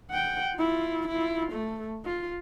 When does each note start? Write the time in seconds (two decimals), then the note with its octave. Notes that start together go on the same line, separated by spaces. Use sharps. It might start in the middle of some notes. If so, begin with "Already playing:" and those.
0.11 F#5 G5
0.56 E4 F4
1.08 E4 F4
1.52 A3
2.05 F4